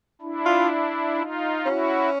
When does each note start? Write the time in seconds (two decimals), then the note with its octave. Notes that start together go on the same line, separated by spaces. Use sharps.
0.22 D4 E4
0.46 F4
1.17 D#4 F4
1.66 C#4 E4 F#4